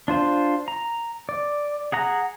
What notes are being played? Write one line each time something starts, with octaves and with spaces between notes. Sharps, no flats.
D4 F4 C5
A#5
D5
G#4 F#5 A#5